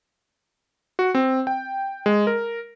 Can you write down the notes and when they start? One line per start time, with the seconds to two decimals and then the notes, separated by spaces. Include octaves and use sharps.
0.99 F#4
1.15 C4
1.47 G5
2.06 G#3
2.27 A#4